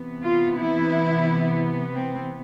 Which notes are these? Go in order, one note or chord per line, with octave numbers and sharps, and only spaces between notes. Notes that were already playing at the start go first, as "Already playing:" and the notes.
Already playing: C3 E3 B3
F4
E4
C4